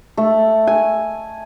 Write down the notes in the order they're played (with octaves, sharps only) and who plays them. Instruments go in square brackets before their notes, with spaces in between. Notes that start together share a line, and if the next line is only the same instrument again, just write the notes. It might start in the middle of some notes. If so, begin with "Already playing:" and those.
[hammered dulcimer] A3
G#5